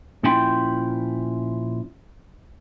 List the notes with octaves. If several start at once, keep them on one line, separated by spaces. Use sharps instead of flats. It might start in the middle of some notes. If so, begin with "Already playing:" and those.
A#2 F3 C#4 E4 G5 C6